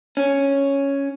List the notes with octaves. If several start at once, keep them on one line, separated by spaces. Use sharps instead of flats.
C#4